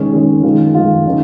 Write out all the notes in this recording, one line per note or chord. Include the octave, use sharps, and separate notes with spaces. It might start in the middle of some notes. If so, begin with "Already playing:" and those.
Already playing: D#3 G#3 C#4
D#3 G#3 C#4
D#3 G#3 F4
D#3 G#3 F4
D#3 C#4 F4